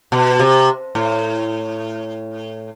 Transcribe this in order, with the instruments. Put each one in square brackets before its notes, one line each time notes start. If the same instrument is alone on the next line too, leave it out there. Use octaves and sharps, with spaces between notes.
[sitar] B2
C3
A2